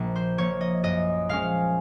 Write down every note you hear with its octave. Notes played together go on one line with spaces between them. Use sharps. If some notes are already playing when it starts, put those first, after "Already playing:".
Already playing: A#1 A#2 F3 A#3
C5
A#2 F3 A#3 C#5
D#5
F#2 D#5
F3 G#3 C#4 F5